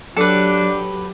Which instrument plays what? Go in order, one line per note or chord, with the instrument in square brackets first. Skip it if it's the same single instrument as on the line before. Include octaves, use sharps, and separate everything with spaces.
[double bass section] F#3 [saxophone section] D4 [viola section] G4 [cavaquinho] A4 B4